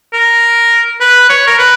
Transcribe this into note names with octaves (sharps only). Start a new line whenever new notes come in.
A#4
B4
C#5
A#4
B4